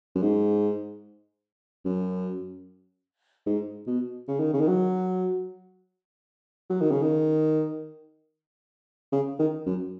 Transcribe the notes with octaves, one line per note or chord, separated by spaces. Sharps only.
F#2
G#2
F#2
G#2
B2
C#3
D#3
C#3
D#3
F#3
F#3
D#3
C#3
D#3
C#3
D#3
F#2